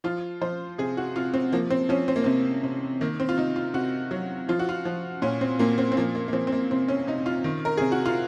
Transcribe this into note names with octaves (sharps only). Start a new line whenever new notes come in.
F3 F4
F3 C5
C3 G#4
F#4
C3 F4
C4
F3 A#3
C4
F3 C#4
C4
A#3
C3 C4
C3
D#3 A#3
C4
F4
C3 D#4
F4
C3 F#4
F#3
F3 F4
F#4
F4
F3
A#2 C#4
C4
A#2 A#3
C4
C4
F3 A#3
A#3
A#3
F3 C4
C4
A#3
C3 C4
C#4
C3 D#4
F4
D#3
A#4
C3 G#4
F#4
F4